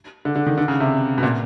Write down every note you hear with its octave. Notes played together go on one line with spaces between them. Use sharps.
D3
D3
D#3
D3
C#3
C3
B2
A#2